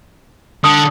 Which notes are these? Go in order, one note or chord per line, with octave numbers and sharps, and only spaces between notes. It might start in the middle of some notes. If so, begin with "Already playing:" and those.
D3 A5 D#6